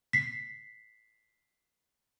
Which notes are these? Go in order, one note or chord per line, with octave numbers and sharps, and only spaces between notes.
B6 C7